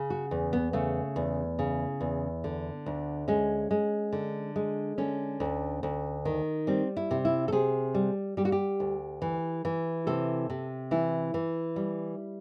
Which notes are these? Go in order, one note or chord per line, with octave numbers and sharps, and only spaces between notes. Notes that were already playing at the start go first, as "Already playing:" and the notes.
Already playing: C#3
F#4
E2
B3
C#3 A3
E2
C#3
E2
D3
D2
G#3 C#4
G#3
D3
G#3
D3 C#4
D2
D2
D#3
G3 C4
E4
C3
E4
A4
C3 G#4
G3
G3 G4
F#4
G4
D2
E3
E3
C3 A4
C3
E3 E4
E3
G3